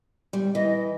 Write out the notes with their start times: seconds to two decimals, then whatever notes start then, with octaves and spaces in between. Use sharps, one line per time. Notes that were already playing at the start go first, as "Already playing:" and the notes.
0.33 G3
0.55 E3 D#5